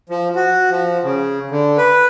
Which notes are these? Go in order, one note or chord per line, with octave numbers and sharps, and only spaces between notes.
F3
F#4
F3
C#3
D3
B4